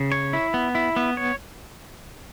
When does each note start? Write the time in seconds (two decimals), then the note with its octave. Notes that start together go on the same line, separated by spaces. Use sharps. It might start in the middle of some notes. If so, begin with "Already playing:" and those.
Already playing: C#3
0.12 C#5
0.33 E4
0.54 B3
0.75 E4
0.96 B3
1.17 C#5